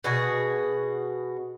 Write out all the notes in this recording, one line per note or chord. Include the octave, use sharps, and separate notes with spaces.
B2 F#4 G#4